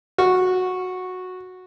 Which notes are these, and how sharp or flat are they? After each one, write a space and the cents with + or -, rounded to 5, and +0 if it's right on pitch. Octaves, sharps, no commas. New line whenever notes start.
F#4 -10